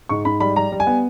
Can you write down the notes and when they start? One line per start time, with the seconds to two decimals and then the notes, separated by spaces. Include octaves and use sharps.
0.09 G#2 C#6
0.25 G#2 B5
0.40 G3 B5
0.56 G3 A#5
0.72 G3
0.80 G#5
0.87 B3